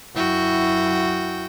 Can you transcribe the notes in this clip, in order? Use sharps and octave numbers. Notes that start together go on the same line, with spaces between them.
F#2 E4 F#4 G5